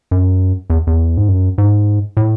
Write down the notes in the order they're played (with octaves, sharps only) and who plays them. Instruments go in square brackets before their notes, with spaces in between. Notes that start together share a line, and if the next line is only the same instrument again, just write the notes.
[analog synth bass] F#2
E2
E2
G#2
F#2
G#2
A2